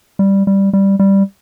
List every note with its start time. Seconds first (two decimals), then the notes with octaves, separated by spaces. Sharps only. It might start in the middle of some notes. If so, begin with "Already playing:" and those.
0.19 G3
0.47 G3
0.73 G3
0.99 G3